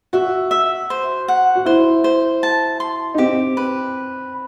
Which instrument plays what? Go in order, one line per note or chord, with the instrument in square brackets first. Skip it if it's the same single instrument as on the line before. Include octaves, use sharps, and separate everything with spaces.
[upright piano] F#4 [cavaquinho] E5
[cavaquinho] E5
C5
F#5
[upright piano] F#4
[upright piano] E4 [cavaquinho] C5
[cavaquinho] C5
A5
C6
[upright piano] D#4
[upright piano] C4 [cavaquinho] G4
[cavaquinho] B4